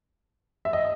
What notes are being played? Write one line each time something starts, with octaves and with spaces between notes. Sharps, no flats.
E5
D#5